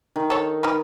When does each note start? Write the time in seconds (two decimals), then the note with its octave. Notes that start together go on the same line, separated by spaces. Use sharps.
0.16 D#3
0.30 A4 C#5
0.63 D#4 A#4 B4